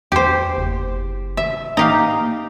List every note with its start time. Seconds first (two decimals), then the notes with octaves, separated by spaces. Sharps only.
0.12 E2 G4 C5
0.57 F#1
1.37 E5
1.77 A#3 D#4 G4 F5